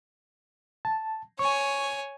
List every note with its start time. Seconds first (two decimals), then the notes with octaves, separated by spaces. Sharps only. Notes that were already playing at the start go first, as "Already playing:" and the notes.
0.85 A5
1.39 C#5 G#5 C#6